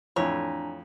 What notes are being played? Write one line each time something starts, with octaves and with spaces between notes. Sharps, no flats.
F2 A2 E3 D4 C#5 G#5 A#5